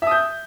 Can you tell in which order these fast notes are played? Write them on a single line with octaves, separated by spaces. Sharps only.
E5 D#6 G6